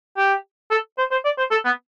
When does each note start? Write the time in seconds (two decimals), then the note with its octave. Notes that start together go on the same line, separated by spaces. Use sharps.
0.17 G4
0.71 A4
0.98 C5
1.11 C5
1.25 D5
1.38 C5
1.51 A4
1.65 B3